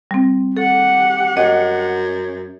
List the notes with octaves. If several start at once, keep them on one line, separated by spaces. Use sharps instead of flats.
G3 C4
G4 A4 F#5
F#2 D#5